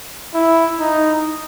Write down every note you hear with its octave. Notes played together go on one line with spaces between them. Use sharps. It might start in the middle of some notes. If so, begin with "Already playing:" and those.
E4
D#4